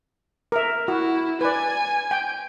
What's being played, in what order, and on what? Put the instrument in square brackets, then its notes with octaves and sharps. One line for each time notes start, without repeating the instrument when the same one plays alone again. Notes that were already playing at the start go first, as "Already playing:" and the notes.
[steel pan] A#4 E5
[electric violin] E4 [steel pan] F#4
[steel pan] B4 D5 [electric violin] G#5
[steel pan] G5